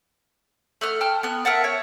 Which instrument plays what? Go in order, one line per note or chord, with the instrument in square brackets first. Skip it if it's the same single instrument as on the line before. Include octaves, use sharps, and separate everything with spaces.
[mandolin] A3 F#5 F6
G5 A5 F6
B3 F#6
A#4 E5 F#5 A5
C#5